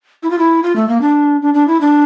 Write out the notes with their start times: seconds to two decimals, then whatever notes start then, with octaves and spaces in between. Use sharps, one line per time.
0.23 E4
0.31 F4
0.39 E4
0.63 F4
0.76 A3
0.89 A#3
1.01 D4
1.42 D4
1.54 D4
1.68 E4
1.81 D4